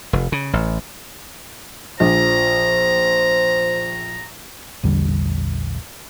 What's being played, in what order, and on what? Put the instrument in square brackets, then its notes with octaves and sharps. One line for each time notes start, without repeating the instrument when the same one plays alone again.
[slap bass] F1
C#3
A1
[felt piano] A#1 F3 [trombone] C5 [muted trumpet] A#5
[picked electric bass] A#1 E2 D3 G3